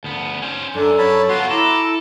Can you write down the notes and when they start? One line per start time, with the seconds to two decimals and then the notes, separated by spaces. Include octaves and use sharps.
0.04 D2 B3
0.42 C#4 C5
0.75 F#2 D4 A4
0.98 C#5 A5 B5
1.29 B3 F4 F#4 C6
1.51 E4 A4 A#5 D6